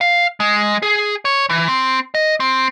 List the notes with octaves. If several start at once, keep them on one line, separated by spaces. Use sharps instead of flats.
F5
G#3
G#4
C#5
E3
C4
D#5
C4